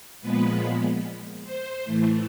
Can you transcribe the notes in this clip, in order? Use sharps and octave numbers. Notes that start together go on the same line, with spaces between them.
A#2 F3 G#3 B3 B4
C5
A2 E3 A3